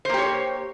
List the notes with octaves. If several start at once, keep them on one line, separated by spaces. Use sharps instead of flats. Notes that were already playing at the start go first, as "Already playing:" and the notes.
A#3 G4 C5 C#5